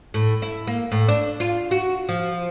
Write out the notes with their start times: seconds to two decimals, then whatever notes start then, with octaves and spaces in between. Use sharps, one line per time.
0.14 A2
0.42 E4
0.67 A#3
0.92 A2
1.08 D4
1.40 F4
1.71 F#4
2.09 F3